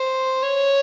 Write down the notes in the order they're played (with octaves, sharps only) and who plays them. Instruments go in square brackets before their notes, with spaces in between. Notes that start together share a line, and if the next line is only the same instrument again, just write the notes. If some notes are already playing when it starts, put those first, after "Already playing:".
Already playing: [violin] C5
C#5